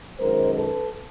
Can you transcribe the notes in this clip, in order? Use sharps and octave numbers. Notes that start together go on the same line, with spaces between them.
F#2 D#3 G#3 A#4 C5
A4 B4